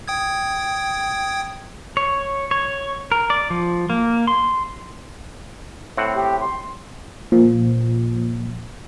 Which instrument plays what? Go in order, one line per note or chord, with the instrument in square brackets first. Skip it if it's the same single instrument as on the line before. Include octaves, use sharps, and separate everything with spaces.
[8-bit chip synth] G5 D#6 G#6
[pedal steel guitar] C#5
C#5
A#4
D5
F3
A#3
C6
[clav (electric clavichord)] A2 C4 F#5
[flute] G4
C6
[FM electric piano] A#2 F3